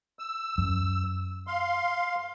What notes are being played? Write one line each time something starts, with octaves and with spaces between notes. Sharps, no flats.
E6
F#2
F5 C6